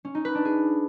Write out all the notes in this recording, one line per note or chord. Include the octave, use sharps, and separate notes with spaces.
C#4
D#4
B4
D4
G#4